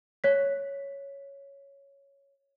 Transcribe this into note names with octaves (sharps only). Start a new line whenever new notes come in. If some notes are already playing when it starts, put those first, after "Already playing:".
C#5 B6